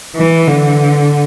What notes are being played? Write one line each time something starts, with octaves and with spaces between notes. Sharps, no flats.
E3
D3